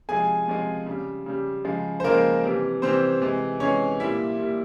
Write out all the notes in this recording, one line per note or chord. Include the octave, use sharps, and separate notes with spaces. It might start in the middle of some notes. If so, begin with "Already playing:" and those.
C3 F3 G#3 G#4 G#5
C3 F3 G#3
C#3 G3
C#3 G3
C#3 F3 G#3
C5
C#3 F3 G#3 A#3 A#4
C3 E3 G3
C3 E3 G3 C4 C5
C3 E3 G#3
C3 E3 G#3 C#4 C#5
A#2 G3 E4 E5
A#2 G3